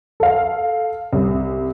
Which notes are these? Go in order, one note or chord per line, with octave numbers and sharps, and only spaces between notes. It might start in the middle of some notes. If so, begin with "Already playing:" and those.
A4 F5
C2